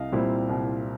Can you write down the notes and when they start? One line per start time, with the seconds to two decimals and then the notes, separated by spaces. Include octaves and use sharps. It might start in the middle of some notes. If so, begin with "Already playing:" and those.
Already playing: C2 D#5 F5
0.12 A#2 G3 C4 E4
0.49 C2